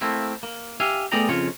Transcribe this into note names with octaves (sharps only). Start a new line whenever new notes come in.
A3 A#3 C4 E4
A#3
G4 E5 F5 G#5
A3 B3 G#4 D5 G5 A#5
F2 C#3 F4 C#5